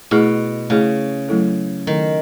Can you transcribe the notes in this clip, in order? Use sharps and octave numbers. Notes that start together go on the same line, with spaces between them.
B2 A3 E4 G#4
C#3 A3 E4 G#4
F#3 A3 E4 A4
D#3 F#3 A3 E4 A4